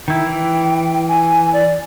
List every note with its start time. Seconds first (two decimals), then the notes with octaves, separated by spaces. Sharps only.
0.08 D#3 E4 G5
0.26 E3
1.08 G#5
1.53 D5